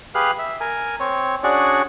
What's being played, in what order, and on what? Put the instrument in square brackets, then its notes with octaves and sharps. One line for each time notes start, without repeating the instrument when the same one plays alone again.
[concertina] G4 G#4 B4 F5 F6 F#6
E5
A#4 G#5
C4 C#5
C#4 D4 F#4 G#4 D5 C#6